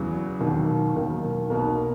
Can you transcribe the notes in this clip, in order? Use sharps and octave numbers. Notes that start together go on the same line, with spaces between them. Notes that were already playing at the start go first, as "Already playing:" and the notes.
Already playing: E2 C#3 F#3
E1 D#2 D#3 F#3 A#3
E1 D#2 D#3 F#3 A#3
B1 B2 A#3 A#4